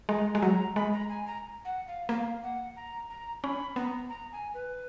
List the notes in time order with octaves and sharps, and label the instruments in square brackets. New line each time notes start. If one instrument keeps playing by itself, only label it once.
[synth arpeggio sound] G#3 [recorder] A#5
[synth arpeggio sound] G#3
[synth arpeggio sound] F#3 [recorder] A#5
[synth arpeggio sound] G#3 [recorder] B5
[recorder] A#5
G#5
A#5
F#5
F5
[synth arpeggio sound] A#3 [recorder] F5
[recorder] F#5
A#5
A#5
[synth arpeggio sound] C#4 [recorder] B5
[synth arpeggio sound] B3 [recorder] A#5
[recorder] A#5
G#5
B4